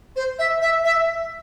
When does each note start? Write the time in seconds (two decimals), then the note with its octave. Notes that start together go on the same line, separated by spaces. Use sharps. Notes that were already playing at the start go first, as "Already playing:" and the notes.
0.16 C5
0.38 E5
0.61 E5
0.84 E5